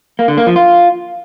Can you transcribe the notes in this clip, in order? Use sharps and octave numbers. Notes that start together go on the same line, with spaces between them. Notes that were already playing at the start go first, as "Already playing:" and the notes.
A#3
D3
A#3
F3
F4